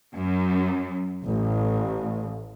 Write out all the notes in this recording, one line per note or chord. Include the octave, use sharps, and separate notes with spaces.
F#2
A1